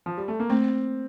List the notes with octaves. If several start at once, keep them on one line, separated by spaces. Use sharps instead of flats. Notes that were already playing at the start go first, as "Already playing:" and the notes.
F3
G3
A3
A#3
A3 C4